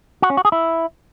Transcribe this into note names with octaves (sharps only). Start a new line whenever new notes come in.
F#4
C#4
F#4
G#4
E4